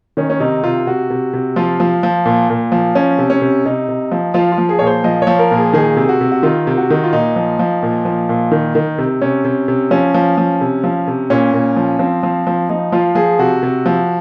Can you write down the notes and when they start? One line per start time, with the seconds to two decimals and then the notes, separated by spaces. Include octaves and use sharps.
0.17 D#3 C#4
0.30 C#4
0.40 C3 D#4
0.64 C3 F4
0.87 C3 F#4
1.10 C3
1.33 C3
1.56 F3 F4
1.80 F3
2.03 F3
2.25 A#2
2.50 A#2
2.72 F3
2.95 F3 C#4
3.18 C3
3.30 C#4
3.42 C3
3.65 C3 D#4
3.89 C3
4.12 F3
4.34 F3 F4
4.52 F4
4.58 F3
4.69 G#4
4.79 A#2 C#5
4.87 C5
5.04 F3 D#5
5.22 C#5
5.27 F3
5.39 A#4
5.51 A#2
5.56 G#4
5.73 D#3 G#4
5.97 C3
6.09 F#4
6.21 C3
6.32 F#4
6.43 D#3 F4
6.67 C3
6.78 F#4
6.90 D#3
7.04 F4
7.13 A#2 D#4
7.36 F3
7.59 F3
7.83 A#2
8.05 F3
8.29 A#2
8.51 D#3
8.75 D#3
8.98 C3
9.21 C3 C#4
9.45 C3
9.68 C3
9.91 F3 C#4
10.14 F3
10.38 F3
10.61 C3
10.84 F3
11.07 C3
11.30 A#2 C#4
11.54 A#2
11.76 F3
11.99 F3 C4
12.23 F3
12.47 F3
12.70 F3 D#4
12.92 F3 F4
13.15 F3 G#4
13.39 C3 F#4
13.63 C3
13.86 F3